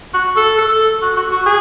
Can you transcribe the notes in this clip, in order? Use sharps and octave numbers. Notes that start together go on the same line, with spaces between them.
F#4
A4
A4
F#4
F#4
F#4
G#4